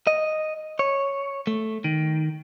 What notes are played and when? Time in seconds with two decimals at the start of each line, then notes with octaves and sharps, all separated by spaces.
0.07 D#5
0.79 C#5
1.47 A3
1.84 D#3